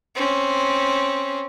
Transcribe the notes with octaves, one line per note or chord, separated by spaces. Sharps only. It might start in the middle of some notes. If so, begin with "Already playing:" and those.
C4 C#4